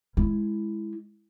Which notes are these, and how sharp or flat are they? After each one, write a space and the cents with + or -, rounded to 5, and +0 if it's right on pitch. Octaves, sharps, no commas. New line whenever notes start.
G#3 +0 E4 +0